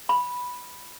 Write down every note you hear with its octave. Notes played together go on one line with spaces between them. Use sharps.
B5